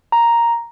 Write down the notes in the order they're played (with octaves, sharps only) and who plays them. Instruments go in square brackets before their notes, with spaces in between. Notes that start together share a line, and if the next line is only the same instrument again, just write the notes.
[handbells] A#5